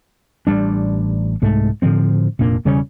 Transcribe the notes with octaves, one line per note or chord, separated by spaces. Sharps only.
A1 D#3 G3 D4
C2 G#2 G#3 A3
A2 D3 F3 C4
F1 A#2 A#3 D4
E1 C#3 G3 C#4